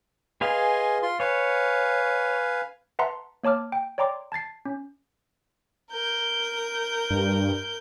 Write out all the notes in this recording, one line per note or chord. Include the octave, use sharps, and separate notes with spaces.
G#4 B4 D#5 F5 G#5 C6
F4 C6
B4 C#5 F5 G#5
B4 E5 F#5 A5 A#5 C6
A#3 C#5 A5 D6 F6
G5
C#5 D5 G5 A#5 C6 D6
A5 G#6 A6 C7
C#4
A#4 G6
G2